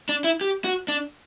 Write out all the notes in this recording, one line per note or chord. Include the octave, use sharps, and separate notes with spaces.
D4
E4
G4
F#4
D4